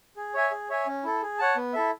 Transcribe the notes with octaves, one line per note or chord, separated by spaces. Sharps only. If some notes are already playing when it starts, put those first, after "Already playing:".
G#4
C#5 E5 G#5
G#4
C#5 E5 G#5
C#4
E4 A4
G#4
C#5 F#5 A5
B3
E4 A4 E5